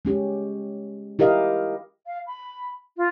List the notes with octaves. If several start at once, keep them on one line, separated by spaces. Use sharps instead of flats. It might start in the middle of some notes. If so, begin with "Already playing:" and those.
G#3 C#4 G4
E4 G4 A#4 D#5 F5
F5
B5
F4